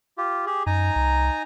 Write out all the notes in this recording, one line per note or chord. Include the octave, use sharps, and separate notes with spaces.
F4 G4
G4 G#4
F#2 D#4 G#5 A#5
C2